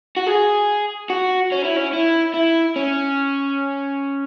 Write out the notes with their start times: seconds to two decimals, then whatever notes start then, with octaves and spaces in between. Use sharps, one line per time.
0.16 F#4
0.26 G#4
1.10 F#4
1.52 C#4
1.64 E4
1.77 C#4
1.93 E4
2.34 E4
2.76 C#4